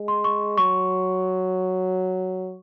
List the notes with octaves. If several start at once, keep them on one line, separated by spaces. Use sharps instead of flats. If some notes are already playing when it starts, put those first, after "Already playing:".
Already playing: G#3
C6
C#6
F#3 C#6